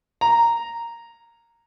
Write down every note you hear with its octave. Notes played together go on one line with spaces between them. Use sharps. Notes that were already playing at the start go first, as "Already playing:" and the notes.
A#5